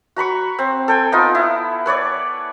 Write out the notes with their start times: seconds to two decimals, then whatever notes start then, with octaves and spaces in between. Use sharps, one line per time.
0.16 F#4 A#5 B5 C#6
0.59 C4
0.88 A4 G5 G#5
1.12 B3 D#4 F4
1.35 E4
1.86 B4 C#5 D5 D6